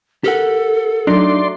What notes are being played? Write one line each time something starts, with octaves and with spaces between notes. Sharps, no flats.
G4 A4 A#4 F#5
F#3 A3 D4 D#4 D5 C6